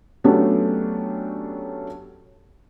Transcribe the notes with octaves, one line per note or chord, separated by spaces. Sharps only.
F#3 A3 B3 C#4 D4 G4